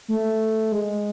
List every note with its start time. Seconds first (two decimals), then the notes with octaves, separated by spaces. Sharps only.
0.08 A3
0.72 G#3